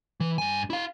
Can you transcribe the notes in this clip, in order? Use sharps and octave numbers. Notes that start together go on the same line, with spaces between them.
E3
G2 G#5
E4 F5